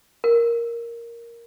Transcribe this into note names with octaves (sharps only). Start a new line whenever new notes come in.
A#4